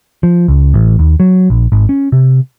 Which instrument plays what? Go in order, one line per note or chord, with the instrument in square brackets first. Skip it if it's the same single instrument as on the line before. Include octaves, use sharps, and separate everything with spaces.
[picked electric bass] F3
C#2
A1
D#2
F#3
A#1
G#1
C#4
C3